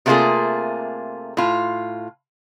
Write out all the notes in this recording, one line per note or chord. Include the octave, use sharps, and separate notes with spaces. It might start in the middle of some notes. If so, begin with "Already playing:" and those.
C3 A3 A#3 D4 F4 G#4
A2 F4